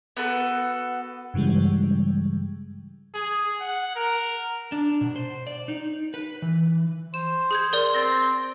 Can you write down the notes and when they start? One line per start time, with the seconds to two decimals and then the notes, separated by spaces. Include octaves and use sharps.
0.17 B3 F#4 A4 B4
1.34 G2 C#3 E3 G3 G#3
3.14 G#4
3.61 F#5
3.96 A#4
4.72 D4
5.01 B2
5.16 C5
5.47 D5
5.68 D#4
6.14 B4
6.42 E3
7.14 C5 E7
7.51 G#4 G6 G#6
7.73 A#4 D5 C6
7.95 C4 A6 A#6